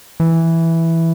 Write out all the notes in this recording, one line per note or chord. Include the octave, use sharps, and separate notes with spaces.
E3